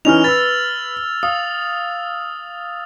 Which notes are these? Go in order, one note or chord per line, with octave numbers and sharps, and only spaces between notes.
E3 C#4 D#4 F6 F7
B4 E6 A6
F5 D#6